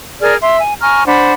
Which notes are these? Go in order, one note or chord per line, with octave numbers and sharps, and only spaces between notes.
G#4 A#4 D5 F6
E5 C6
G#5
G#5 A#5 C#6 F6
D4 C5 F#5 B5